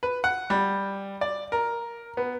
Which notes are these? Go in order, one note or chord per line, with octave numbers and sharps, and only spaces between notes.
B4
F#5
G3
D5
A#4
B3